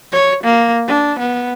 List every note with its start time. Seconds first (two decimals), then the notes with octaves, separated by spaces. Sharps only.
0.12 C#5
0.43 A#3
0.88 D4
1.19 B3